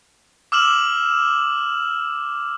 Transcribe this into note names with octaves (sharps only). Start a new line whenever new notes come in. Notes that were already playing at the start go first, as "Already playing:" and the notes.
D6 E6 F6 E7 F#7